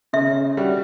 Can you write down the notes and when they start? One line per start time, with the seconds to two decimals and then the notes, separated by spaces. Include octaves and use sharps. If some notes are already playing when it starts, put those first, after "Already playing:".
0.13 C#3 E5
0.57 G3 D4 F#4